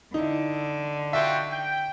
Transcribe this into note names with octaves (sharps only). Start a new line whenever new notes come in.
D3 D#4 E4
F4 F#4 E5 G5
G5